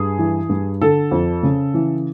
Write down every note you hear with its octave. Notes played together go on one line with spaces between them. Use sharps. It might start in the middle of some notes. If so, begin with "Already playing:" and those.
Already playing: G2 G#4
E3
G2
D3 A4
F2
C#3
E3